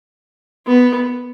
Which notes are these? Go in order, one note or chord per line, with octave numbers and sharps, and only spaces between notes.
B3